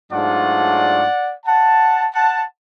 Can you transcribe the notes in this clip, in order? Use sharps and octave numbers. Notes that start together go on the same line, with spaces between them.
G#2 F#3 A3 D4 F4 D5 F#5
F#5 A5
F#5 A5